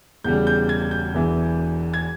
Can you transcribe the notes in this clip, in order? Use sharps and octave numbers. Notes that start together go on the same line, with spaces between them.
E1 E2 C#3 G3 G6
G6
G#6
G6
E1 E2 E3
G#6